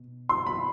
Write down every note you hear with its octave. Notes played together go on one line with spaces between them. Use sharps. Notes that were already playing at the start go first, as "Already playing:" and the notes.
Already playing: B2
C6
B5